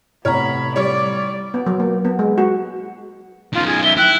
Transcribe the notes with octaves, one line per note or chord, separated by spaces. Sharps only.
A2 C3 B3 C#5 A#5 B5 F6
G3 C#5 D5
B3
F#3
A#3
B3
G#3
F#4
B1 D#3 F4
G#4
E5 G7
E4 G5 F#6